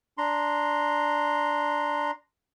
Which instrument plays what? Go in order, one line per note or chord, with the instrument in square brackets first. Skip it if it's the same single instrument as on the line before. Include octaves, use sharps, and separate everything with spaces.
[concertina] D4 A#5 C6